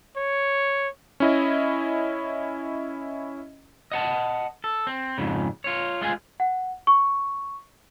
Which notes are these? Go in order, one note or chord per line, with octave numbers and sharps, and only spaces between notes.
C#5
C#4 E4 D#5
D#5 F#5 A5
A4
C4
F2 G#2 C#3
F4 C#5
G#3 F4 G#4 G#5
F#5
C#6